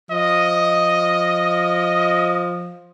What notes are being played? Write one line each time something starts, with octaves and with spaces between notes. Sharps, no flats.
F3 D#5